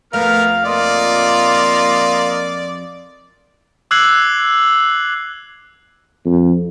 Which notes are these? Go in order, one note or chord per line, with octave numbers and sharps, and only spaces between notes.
F2 A3 B3 A#4 F5 F6
A#3 F4 D5 D#5
D6 E6 F#6 G#6 C7 F#7
F2